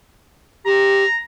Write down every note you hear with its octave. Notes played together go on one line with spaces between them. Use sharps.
G4 A#5